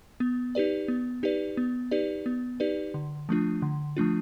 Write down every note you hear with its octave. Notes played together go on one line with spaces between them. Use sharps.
B3
D#4 G4 B4 D5
B3
D#4 G4 B4 D5
B3
D#4 G4 B4 D5
B3
D#4 G4 B4 D5
D3
F3 A3 D4 F4
D3
F3 A3 D4 F4